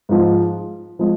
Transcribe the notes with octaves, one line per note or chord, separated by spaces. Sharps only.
G#2 F3 G#3
F3 G#3